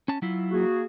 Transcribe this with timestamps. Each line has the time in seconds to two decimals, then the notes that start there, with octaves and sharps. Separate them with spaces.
0.08 C#4 A5
0.22 F#3 E4 F4
0.51 A#3 F#4 G#4